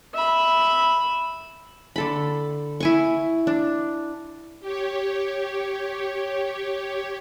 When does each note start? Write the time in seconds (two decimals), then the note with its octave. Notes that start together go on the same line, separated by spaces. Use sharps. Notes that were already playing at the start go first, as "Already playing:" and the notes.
0.14 E5 B5
1.96 D3 A4 B5
2.80 E4 G#5 C#6
3.47 D4
4.60 G4 C#5